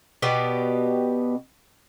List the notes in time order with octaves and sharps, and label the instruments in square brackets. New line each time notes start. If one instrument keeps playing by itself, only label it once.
[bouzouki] B2 B3 G4 D5